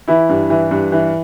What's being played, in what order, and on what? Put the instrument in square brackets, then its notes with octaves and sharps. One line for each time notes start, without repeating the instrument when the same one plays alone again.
[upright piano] E3 E4
G2
E3
G2
E3